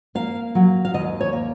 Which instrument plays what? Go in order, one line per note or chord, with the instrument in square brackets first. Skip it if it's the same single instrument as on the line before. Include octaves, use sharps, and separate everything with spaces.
[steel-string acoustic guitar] A#3 F5
F#3
F5
D#2 D#5
C#5
A#3